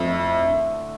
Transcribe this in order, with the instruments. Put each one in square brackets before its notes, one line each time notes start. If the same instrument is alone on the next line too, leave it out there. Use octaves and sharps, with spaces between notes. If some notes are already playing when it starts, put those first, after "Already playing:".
Already playing: [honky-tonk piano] F2 [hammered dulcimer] A3 A4
[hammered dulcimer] E4
D3